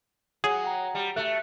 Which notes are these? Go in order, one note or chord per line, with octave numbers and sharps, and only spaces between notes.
F#3 G#4 F#5
F#5 G5 A#5
G3
A3 F#6